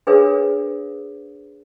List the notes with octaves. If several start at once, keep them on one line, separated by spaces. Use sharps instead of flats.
D4 G#4 A#4 B4 C#5 F5